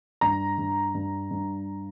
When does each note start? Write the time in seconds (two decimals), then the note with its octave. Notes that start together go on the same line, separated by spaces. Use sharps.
0.21 G2 A#5
0.58 G2
0.95 G2
1.31 G2